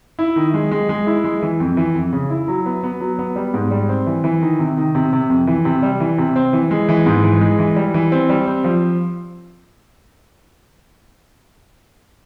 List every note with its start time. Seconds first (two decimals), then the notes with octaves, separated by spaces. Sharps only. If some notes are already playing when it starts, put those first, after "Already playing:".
0.19 E4
0.36 D#3
0.54 G#3
0.71 G#3
0.89 G#3
1.07 E4
1.24 G#3
1.42 E3
1.60 F2
1.77 E3
1.95 F2
2.13 C#3
2.30 E4
2.48 F#3
2.66 B3
2.83 B3
3.01 F#3
3.19 B3
3.36 G3
3.54 G#2
3.71 G3
3.89 C4
4.07 E3
4.24 E3
4.42 D#3
4.59 C3
4.77 D#3
4.95 C3
5.13 C3
5.30 F2
5.47 E3
5.65 C3
5.83 G3
6.00 E3
6.18 C3
6.36 C4
6.53 E3
6.71 G#3
6.89 E3
7.06 G#2
7.24 E3
7.41 G#3
7.59 E3
7.76 G3
7.94 E3
8.12 C4
8.29 G3
8.47 C4
8.64 F3